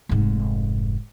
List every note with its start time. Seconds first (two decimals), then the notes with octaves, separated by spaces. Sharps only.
0.09 F1 G#2